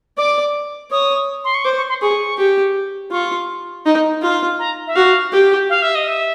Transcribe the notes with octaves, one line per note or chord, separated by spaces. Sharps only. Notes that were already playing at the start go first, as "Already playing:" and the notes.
D5 D6
C#5 D#6
C6
C#6
C5 D6
C#6
C6
G#4 C#6
G4
F4 C#6
D#4
F4
A#5
E5
F#4 F5
G4
F5
E5
D#5
E5